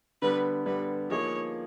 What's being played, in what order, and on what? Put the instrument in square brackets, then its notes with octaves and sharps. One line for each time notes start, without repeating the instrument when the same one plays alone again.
[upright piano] D3 G3 B3 [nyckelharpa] B4
[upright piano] D3 G3 B3 [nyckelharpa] B4
[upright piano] F3 A#3 D#4 G#4 [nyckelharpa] C#5